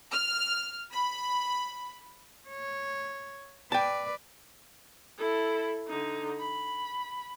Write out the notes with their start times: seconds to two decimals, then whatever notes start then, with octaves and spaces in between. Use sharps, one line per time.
0.11 F6
0.92 B5
2.48 C#5
3.72 B4 D5 G5 A5
5.18 E4 A4
5.88 D3 D#4
6.39 B5